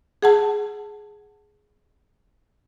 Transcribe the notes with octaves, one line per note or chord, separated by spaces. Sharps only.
G#4 F#5 A5